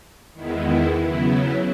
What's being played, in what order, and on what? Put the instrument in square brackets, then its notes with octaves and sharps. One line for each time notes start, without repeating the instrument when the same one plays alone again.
[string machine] E2 D#3 G#3 B3 E4
C#3 F#3 B3 E4